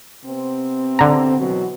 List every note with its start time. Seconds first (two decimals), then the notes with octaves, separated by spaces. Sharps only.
0.25 C3 B3 C4
0.99 D3 A#5
1.38 B2 E3 F#3